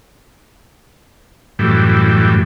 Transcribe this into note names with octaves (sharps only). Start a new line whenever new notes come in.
F#2 A2 E3 G3